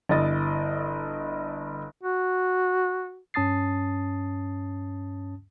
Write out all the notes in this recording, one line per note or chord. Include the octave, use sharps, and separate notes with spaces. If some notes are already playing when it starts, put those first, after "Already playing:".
G1 E4 D#5 A6
F#4
G2 C#4 A5 D#6 A6 C7